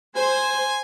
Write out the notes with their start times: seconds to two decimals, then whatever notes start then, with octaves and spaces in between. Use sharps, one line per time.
0.16 C5 G#5